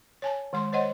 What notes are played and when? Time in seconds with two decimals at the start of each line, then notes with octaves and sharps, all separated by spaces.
0.22 C#5 G#5 A5
0.53 D#3 G#3 C6
0.73 C5 C#5 D#5 F#5 C6